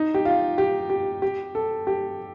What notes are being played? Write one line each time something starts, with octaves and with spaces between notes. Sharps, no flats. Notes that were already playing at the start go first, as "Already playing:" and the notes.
Already playing: D#4
G4
F4
G4
G4
G4
A4
G4